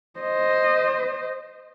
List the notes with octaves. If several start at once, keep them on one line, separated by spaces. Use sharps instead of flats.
C5 D#5